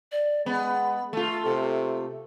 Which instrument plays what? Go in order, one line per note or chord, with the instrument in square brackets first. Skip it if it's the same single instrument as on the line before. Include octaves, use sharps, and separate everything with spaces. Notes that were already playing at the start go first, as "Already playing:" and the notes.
[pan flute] D5
[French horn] G#3 [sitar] B3 [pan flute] B5
[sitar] A3 F4 [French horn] A4
[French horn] C3 [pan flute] A4